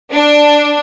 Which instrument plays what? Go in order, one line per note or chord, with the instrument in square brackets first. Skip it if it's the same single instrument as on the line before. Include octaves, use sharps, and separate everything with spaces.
[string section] D4